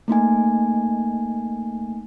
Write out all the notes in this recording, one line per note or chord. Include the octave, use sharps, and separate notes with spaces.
A3 A#3 D#4 G#5